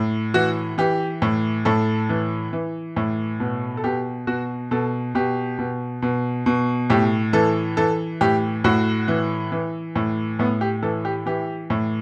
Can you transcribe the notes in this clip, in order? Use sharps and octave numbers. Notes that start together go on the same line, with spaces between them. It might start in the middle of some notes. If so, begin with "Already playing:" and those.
Already playing: A2
E3 F#4
E3 G4
A2
A2 A4
E3
E3
A2
B2
A4
B2 G4
B2 F#4
B2 A4
B2 G4
B2
B2
B2
A2 G4
E3 A4
E3 A4
A2 G4
A2 F#4
E3
E3
A2
A2 B3
G4
E3 A4
G4
E3 G4
A2